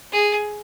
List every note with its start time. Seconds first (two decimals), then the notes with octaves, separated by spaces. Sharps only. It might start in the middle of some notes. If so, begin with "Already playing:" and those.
0.12 G#4